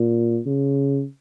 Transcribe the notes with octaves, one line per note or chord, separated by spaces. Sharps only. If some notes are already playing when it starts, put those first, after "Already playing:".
Already playing: A#2
C#3